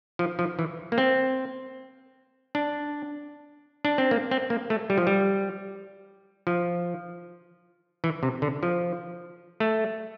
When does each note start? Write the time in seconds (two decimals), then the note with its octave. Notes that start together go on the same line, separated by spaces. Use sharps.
0.19 F3
0.39 F3
0.59 E3
0.92 A#3
0.98 C4
2.55 D4
3.85 D4
3.98 C4
4.11 A#3
4.31 C4
4.50 A#3
4.70 A3
4.90 G3
4.98 F3
5.07 G3
6.47 F3
8.04 E3
8.23 C3
8.42 D3
8.63 F3
9.60 A3